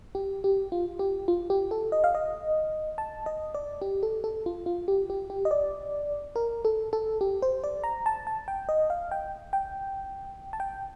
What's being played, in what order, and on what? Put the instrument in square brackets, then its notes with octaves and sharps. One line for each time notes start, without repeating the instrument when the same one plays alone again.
[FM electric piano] G4
G4
F4
G4
F4
G4
A4
D#5
F5
D#5
A5
D#5
D5
G4
A4
A4
F4
F4
G4
G4
G4
D#5
D5
A#4
A4
A4
G4
C5
D5
A#5
A5
A5
G5
D#5
F5
G5
G5
A5
G5